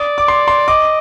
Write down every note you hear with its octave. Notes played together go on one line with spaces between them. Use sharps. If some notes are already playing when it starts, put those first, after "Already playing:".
Already playing: D5 D#6
D6
C6
C6
D#5 D6